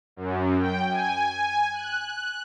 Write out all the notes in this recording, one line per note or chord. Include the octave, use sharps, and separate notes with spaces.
F#2
G5
G#5
F#6